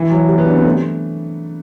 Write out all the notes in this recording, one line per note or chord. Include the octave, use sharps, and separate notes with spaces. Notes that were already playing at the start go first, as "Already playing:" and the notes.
Already playing: E3
F#3
G3
B3
D4
C4
A3